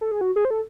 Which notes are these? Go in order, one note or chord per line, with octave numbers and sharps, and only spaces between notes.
A4
G#4
F#4
G#4
C5
A4